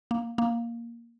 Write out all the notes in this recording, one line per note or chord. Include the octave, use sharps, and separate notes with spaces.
A#3
A#3